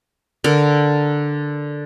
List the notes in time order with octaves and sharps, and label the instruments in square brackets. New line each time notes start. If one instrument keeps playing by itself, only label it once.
[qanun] D3 A#4